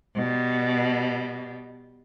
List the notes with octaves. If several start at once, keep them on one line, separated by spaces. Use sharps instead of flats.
B2 G3